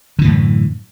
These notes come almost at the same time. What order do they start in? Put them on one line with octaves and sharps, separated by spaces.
D3 E3 A2 F#2